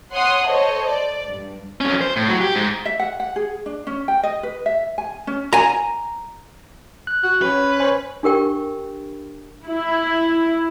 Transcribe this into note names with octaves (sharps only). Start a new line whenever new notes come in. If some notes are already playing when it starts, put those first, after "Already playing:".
C#5 F#5 C6 D#6
A4 C5 C#5 D#5
D5
G2
F2 C#4
C5
A2
F#3 F#4
G4
G#2
E5
F#5
F#5
G#4
D4
C#4
G5
D#5
B4
E5
G#5
C#4
G#5 A#5
F#6
F#4 F#6
C#4 B4
C5 C#5 G#5
D4 G4 A#4 G5 C#6
E4